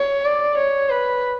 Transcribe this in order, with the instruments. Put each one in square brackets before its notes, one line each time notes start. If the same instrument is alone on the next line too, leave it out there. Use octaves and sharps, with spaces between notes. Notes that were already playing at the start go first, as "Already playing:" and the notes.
Already playing: [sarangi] C#5
D5
C#5
B4